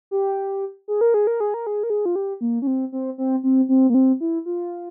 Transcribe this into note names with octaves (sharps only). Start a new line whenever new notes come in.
G4
G#4
A#4
G#4
A#4
G#4
A#4
G#4
A#4
G#4
F4
G4
A#3
C#4
C4
C4
C4
C4
C4
A#3
C4
E4
F4